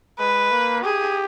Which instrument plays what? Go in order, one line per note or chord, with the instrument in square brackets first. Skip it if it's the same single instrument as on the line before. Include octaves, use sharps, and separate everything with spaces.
[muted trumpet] G#3 [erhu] B4
[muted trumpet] A#3
[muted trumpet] G4 [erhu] G#4